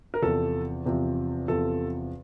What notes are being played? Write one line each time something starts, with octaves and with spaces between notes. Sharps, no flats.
A#4
E2 C3 F3 A4
E2 C3 F3
E2 C3 F3 A4